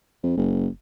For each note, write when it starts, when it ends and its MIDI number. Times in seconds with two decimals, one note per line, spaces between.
0.23 0.33 41
0.37 0.67 30